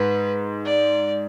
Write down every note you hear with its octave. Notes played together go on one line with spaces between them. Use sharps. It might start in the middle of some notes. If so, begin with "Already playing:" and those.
Already playing: G#2 B4
D5